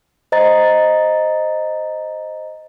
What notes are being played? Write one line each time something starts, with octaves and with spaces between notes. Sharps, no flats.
C5 D#5 A#5 A6